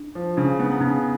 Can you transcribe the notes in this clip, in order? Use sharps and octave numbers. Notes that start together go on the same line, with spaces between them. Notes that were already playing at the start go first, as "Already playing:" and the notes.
Already playing: D4
F3
C#3 D4
B3
E4
C#3 D#4